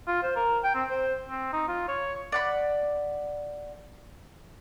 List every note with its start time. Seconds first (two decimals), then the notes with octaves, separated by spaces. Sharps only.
0.07 F4
0.23 C5
0.36 A#4
0.63 G5
0.75 C4
0.89 C5
1.29 C4
1.53 D#4
1.68 F4
1.88 C#5
2.32 D5 F#5 B5